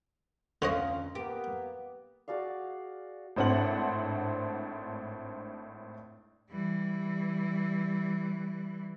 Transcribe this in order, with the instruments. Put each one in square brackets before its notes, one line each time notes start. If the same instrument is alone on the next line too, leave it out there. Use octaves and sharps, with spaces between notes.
[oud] F2 C#4 F4 [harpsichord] D3 C#5 D#5
[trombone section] A#3 B3 [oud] G4
[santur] F#4 G#4 D5 F5
[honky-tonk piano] G#1 A2 C4 D4 F#5 F#7
[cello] E3 G3